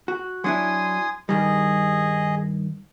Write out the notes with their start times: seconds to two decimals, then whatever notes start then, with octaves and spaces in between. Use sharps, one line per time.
0.08 F#4
0.44 F#3 D4 E4 G#5 C6 D#6
1.29 G2 D#3 G3 G#4 D#5